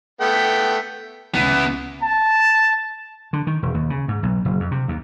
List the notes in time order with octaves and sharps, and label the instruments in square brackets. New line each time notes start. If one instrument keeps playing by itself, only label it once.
[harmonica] A3 B3 G5
[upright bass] C#2 C#3 [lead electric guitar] B3 E4
[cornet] A5
[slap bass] D3
D#3
E1
D#2
C#3
G#2
B1
F#1
F2
C3
D#2